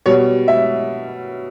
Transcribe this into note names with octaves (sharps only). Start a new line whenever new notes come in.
B2 G3 C#5
E5